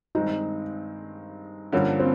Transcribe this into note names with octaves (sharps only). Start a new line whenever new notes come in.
G2 D#3 G#3 C4 D#4
G2 D3 F3 A#3 C#4
C4